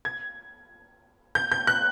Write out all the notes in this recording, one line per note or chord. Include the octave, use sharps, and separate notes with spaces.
G#6
G6
G6
F#6